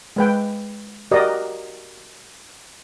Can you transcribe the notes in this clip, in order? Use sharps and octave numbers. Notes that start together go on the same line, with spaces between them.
G#3 B4 G5
F#4 G4 A#4 D5 D#5